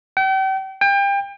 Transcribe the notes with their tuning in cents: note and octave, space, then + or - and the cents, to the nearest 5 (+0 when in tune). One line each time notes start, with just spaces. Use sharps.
G5 -40
G5 +30